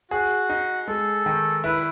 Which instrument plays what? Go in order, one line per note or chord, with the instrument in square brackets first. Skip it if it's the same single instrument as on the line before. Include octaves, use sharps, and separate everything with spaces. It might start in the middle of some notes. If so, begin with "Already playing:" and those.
[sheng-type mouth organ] F#4 [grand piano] G#4
[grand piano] D#4
[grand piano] G#3 [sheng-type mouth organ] A4
[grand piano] D#3
[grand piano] E4 [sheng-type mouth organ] B4